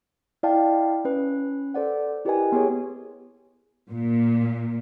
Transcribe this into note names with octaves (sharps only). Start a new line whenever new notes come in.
E4 D5 D#5 F5 G5 A5
C#4 B4
A4 C5 D5 F#5
E4 G4 A#4 B4 D#5 G#5
B3 G4 G#4 C#5
A#2